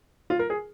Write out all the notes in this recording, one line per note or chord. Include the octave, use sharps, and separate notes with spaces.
F4
A#4
G#4